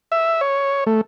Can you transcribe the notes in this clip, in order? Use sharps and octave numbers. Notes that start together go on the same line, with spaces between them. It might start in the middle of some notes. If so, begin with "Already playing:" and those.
E5
C#5
A3